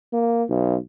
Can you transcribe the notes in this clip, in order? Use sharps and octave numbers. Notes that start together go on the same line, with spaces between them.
A#3
B1